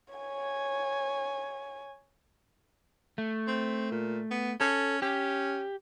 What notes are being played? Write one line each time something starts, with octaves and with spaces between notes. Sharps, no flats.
C#5 G#5
A3
C4
A#2
B3
C#4 A4
C#4 G4